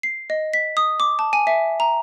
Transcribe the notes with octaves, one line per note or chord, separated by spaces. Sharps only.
C7
D#5
B6
D#6
D6
A5
G#5
E5
A#5